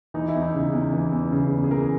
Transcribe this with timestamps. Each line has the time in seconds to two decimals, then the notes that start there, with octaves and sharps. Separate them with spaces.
0.14 E3 D#4
0.28 E4
0.35 E2
0.42 D#4
0.54 C#3
0.73 E2
0.93 E3
1.12 E2
1.32 C#3
1.51 E2
1.64 G#4
1.70 E3 A#4